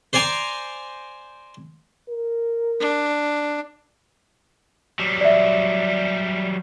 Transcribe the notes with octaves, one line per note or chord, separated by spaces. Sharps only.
C5 D5 G#5 A#5 D6
A#4
D4
F#3 G3
D5 E5